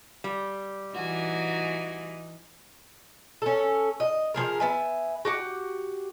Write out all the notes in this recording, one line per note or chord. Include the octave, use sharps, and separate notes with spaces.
G3
E3 D#4 F#4 G#5
C#4 A4
D#5
F3 G#3 G#4 A#4
B3 E5 G#5
F#4 G4 F#5